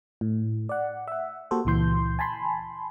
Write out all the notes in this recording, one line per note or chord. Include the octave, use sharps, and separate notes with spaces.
A2
D5 F#5
E5 F#5
A#3 F#4 G4 A4 C5
C#2 A#2 E3 C6 G6
G#5 A5 B5 C6